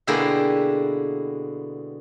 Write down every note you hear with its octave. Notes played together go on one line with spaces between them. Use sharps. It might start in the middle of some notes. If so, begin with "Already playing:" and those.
B2 D3 G#3 A#3 E4 G4